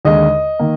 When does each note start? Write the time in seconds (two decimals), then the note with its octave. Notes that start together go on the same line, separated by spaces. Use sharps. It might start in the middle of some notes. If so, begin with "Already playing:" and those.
0.05 D#2 D3 G#3 D#5
0.59 D#3 A#3